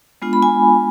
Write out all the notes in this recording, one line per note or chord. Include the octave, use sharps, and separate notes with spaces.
G#3 B3 D4 F4
B5
G#5